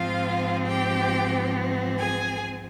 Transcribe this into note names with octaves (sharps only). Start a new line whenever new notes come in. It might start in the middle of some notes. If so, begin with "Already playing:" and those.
Already playing: G#2 F3 C4 F4 F5
G4 G5
G#4 G#5